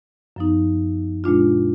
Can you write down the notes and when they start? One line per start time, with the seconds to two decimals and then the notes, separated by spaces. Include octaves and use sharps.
0.36 F#2 F3 B3 D#4
1.24 A#2 G#3 D4 F4